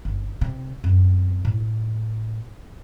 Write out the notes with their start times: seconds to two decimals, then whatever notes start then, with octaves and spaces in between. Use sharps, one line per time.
0.05 G1
0.41 C3
0.84 F#2 C4
1.45 A2